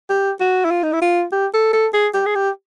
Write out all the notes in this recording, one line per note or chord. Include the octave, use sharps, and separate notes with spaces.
G4
F#4
E4
F4
D#4
E4
F4
G4
A4
A4
G#4
G4
G#4
G4